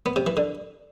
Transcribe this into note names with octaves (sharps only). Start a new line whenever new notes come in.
B3
C3
E3
D3